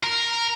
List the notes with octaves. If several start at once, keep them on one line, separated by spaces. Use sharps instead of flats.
A#4